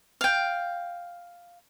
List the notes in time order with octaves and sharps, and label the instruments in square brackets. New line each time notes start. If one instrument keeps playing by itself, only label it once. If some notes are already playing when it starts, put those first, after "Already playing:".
[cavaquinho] F5 G5